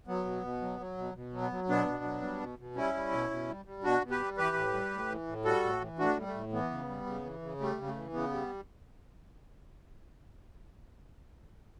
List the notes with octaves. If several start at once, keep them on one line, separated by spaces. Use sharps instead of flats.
F#3 B3
B2
B2
F#3
F#3
B2
B2
F#3
B3
F#3
B2 B3 D4
B2
F#3
G3
B2
B2
G3 C#4 E4
G3
B2
B2
G3
G3
B2 D4 F#4
B2
G4 B4
G3
E3 G4 B4
A2
G3
A2
E3
A2
G3 F#4 A4
A2
E3
A2 D4 F#4
G3
A3
A2
E3 B3
C#3
G3
C#3
E3
C#3
G3 A3
C#3
A3
E3
C#3 B3
G3